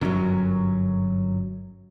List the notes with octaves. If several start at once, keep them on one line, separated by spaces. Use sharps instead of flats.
G1 F#2 F#3 C#4 A#4